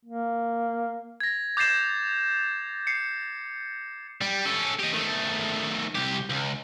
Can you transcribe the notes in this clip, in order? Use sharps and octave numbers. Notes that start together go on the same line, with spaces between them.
A#3
G#6 A#6
D6 G6 A6 C7 E7
C7 C#7
G3
C#4 A4
G4 D#5
D#3 A3
C2 G4
C#2